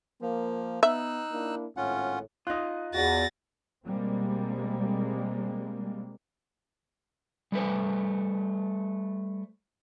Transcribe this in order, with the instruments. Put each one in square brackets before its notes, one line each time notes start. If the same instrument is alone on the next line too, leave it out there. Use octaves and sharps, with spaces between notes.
[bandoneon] F3 [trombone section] A#3
[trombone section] B3 [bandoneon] D#4 E6 F#6 [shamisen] E5
[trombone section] A#3 D4 E4
[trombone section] G#1 A2 [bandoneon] C#4 F4 F#5
[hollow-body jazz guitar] D#4 F4 [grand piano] D#6 F#6
[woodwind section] E2 [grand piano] F#4 F#5 [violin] A6 A#6
[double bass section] B2 G3 G#3 A#3 C4
[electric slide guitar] G3 A3 B4 C5